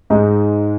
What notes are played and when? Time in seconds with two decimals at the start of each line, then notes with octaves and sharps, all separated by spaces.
0.10 G#2 G#3 D#4